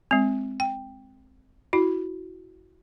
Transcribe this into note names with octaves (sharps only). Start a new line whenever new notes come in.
G#3 C4
G5
E4 F#4